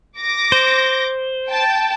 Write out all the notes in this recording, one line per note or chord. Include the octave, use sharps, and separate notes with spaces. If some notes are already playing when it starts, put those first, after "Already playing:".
D6 A#6
C5
G5 A5